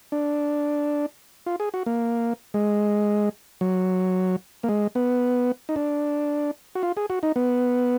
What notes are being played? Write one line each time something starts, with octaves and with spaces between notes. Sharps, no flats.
D4
F4
G#4
F#4
A#3
G#3
F#3
A#3
G#3
B3
D#4
D4
F#4
F4
G#4
F#4
D#4
B3